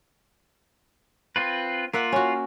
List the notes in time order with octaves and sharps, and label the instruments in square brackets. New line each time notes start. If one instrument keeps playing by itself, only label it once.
[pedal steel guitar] C4 F4 B4
[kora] A#3 E5 F#5 [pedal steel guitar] F4
[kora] C#4 F#4